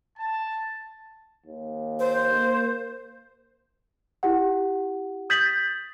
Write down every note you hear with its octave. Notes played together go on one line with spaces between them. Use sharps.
A5
D#2
C5
A#3
E4 G4 F#5
D#6 G6 A6 B6 F#7